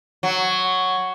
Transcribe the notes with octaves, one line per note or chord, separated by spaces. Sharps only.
F#3